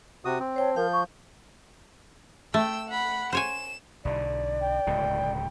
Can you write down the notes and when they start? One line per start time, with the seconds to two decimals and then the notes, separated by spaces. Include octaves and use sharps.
0.25 C3 F#4 D#6
0.40 C4
0.56 C5 C#5 G5 A5
0.76 F3 A#4 F5 G6
0.93 C#6
2.54 A3 G5 E6
2.89 F#5 B5
3.33 C5 C#5 G#5 E7
4.05 B1 D3 D5
4.61 G5
4.87 D1 C#2 B2